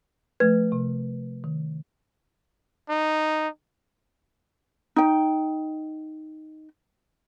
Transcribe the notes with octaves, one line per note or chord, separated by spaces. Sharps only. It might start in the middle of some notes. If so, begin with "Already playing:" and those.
F3 A3 B4 G#6
C3
D#3
D#4
D#4 G5